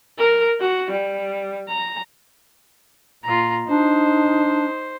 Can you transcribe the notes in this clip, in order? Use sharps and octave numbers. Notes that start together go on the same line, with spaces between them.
A#4
F#4
G3
A#5
A#2 F4 A#5
D4 D#4 C5